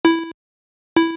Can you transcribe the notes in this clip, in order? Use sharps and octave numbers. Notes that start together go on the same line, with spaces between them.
E4
E4